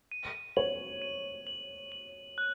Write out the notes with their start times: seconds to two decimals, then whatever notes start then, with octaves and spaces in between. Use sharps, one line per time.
0.12 D#7
0.57 C#5 F#7
1.02 D#7
1.47 F#7
1.92 F#7
2.38 F#6